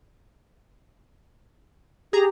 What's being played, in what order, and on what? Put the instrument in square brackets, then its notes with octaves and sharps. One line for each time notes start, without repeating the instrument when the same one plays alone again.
[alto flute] G4 [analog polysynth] G#4 A#5